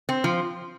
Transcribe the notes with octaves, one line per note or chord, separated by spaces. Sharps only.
C4
F3